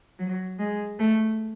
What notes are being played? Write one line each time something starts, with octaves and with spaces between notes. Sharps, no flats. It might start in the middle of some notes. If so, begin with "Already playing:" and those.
F#3
G#3
A3